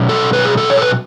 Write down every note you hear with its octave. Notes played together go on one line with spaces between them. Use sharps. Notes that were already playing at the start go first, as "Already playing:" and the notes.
Already playing: B2 F#3 C#4
A4
B4
G#4
A4
C#5
A4
B4